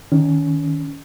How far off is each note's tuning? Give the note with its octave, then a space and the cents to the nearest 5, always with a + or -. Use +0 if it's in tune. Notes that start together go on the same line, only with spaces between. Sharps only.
D#3 +0 C#4 +25